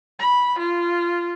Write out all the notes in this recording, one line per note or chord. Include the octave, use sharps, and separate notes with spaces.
B5
F4